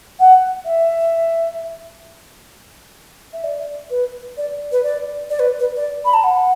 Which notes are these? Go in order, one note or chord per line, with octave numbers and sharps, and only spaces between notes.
F#5
E5
E5
D5
B4
D5
B4
D5
D5
B4
B4
D5
B5
A5
F#5